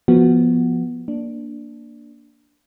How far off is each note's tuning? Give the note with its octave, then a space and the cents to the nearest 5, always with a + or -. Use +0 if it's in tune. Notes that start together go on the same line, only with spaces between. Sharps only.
F3 -10 B3 -20 F#4 +0
A#3 +0 D4 +0